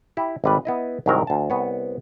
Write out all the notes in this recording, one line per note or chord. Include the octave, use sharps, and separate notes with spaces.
E4 G4
G#1 G3 B4
B3 E4 D#5
C2 G#2 D#3 F#3 A#4
D2 A5
C2 B3 C#5